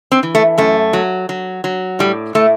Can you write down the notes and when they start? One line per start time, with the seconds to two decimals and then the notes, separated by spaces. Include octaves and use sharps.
0.12 C4
0.23 E3
0.35 A3
0.58 F#2 A3
0.93 F#3
1.29 F#3
1.64 F#3
1.99 A2 G3
2.35 A2 A3